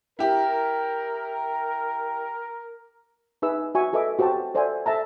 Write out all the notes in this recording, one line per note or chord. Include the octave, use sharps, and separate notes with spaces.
E4 G4 A#4
D#4 G#4 B4 E5 E6
F#4 E5 G#5 C#6
G#4 A4 B4 D#5 E5 D6
F#4 G4 C5 G5 A5
A4 C5 D5 E5 F#5 G#5
A4 C5 E5 A5 A#5